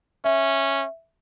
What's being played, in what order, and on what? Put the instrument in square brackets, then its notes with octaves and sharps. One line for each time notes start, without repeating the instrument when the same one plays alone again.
[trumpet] C#4 [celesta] E5